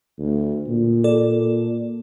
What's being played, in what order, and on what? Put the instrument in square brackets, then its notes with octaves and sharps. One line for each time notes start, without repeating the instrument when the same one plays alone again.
[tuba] D2
A#2
[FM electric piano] A4 D5